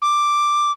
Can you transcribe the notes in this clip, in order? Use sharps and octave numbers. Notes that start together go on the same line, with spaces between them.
D6